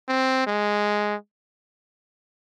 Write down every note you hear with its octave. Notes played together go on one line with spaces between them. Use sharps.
C4
G#3